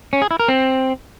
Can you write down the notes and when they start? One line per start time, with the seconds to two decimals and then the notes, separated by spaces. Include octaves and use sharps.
0.13 C#4
0.22 G#4
0.31 E4
0.40 A#4
0.48 C4